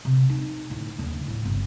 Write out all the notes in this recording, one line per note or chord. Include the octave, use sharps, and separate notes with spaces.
C3
D#4
A2 D3
D#2 D3
A2 F3
G1 C#2